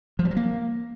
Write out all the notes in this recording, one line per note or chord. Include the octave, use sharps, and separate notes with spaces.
F3
G3
F#3
A#3